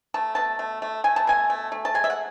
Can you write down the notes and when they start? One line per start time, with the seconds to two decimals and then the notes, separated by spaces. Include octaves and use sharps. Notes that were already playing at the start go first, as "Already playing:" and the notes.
0.14 A3 A5
0.35 B2 A5
0.59 A3
0.82 A3
1.04 A3 G#5
1.16 A5
1.27 B2 G#5
1.50 A3
1.72 A3
1.85 A5
1.94 G#3 G#5
2.04 E5
2.10 F#5